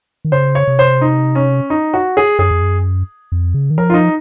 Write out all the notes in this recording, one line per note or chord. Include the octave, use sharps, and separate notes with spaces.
D#3
C#3 C5
C#5
C3
C5
D#4
C#4
D#4
F#4
G#4
F#2 G#4
F2
F#2
F2
C#3
D#3
F3 A#4
F4
D#4